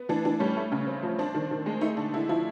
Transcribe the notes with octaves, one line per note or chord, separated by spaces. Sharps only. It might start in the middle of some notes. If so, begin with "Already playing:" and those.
Already playing: B3
E3 D4
E3 D4
G3 C#4
A3
C#3
C4
F3
C4 D4
D#3
D#3
G#3
A3 D#4
D3 D4
D3 E4
F3 E4